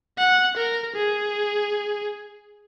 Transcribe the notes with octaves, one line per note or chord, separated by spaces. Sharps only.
F#5
A#4
G#4